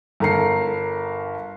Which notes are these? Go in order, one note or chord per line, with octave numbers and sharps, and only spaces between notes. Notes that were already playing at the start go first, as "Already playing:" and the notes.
G1 A4 A#4 A#5 C7